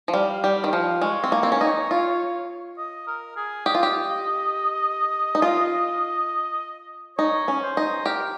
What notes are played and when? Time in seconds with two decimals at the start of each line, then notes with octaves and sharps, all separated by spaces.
0.08 F3
0.14 G3 F5
0.44 G3 G5
0.64 D#3
0.73 F3 F5
1.02 G#3 C#5
1.24 C4
1.32 A#3
1.43 C4
1.52 C#4
1.61 D#4
1.91 F4
2.78 D#5
3.07 A#4
3.37 G#4
3.66 G4 D#5
3.75 F4
3.83 G4
5.35 D#4
5.42 F4
7.18 D#4 C#5
7.48 C#4
7.62 C5
7.77 D#4
8.06 G4 A#4